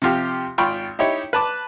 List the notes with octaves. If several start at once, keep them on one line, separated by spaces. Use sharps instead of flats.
C3 F3 F4 G4
G#1 F4 G5 B5 C#6
D#4 E4 G4 C#5
B4 A5 D6